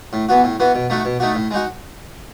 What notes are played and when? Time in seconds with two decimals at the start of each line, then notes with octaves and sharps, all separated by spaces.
0.13 A2
0.29 E3 B3 F#4
0.44 A2
0.60 E3 B3 F#4
0.75 B2
0.90 A3 D#4 F#4
1.05 B2
1.20 A3 D#4 F#4
1.35 A2
1.51 G#3 D#4 F#4